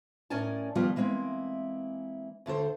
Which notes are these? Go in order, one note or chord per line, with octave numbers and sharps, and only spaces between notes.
A2 C#4 A#4 D5 G#5 A5
D#3 F3 G3 A#3 B3 F4
E3 G#3 A#3 C4 E4
D2 D3 A4 C5